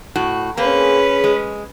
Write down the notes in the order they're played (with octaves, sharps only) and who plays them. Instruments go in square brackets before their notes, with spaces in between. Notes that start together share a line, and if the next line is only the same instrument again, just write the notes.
[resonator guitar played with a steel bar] A2 F#4
[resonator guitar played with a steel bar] A#3 C4 [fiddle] C#4 B4 [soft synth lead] G#4
[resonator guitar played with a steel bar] G#3